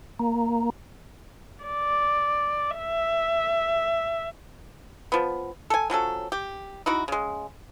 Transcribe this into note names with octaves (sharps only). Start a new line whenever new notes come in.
A#3
D5
E5
F3 B3
A4 G#5
F3 F#3 C#4 A4
G4
D#4 E4 F#4
C#3 G#3